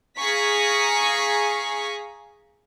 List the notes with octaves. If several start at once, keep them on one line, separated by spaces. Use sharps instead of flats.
G#4 F5 G#5 A#5 C#6 B6